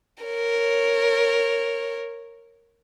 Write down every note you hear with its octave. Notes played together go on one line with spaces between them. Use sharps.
A#4 C#5